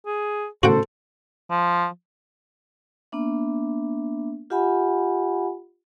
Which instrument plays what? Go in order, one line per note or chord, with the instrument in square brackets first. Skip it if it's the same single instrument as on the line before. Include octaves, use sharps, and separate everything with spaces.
[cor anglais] G#4
[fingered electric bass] A2 C#3 [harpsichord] F#4 F#5 G5 [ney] A4 [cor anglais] C5
[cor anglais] F3
[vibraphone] A#3 B3 D4 E5
F4 G4 E5 F#5 G#5 B5